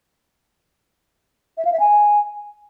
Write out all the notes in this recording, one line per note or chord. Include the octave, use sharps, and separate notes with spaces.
E5
F5
E5
G#5